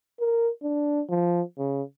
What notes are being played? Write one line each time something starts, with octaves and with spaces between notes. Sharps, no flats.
A#4
D4
F3
C#3